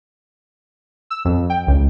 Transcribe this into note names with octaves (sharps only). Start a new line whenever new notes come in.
E6
F2
G5
C#2